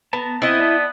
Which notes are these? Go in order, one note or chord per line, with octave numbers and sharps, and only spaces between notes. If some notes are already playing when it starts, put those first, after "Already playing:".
B3 A5 A#5
B3 C4 E4 D#5
D5 A5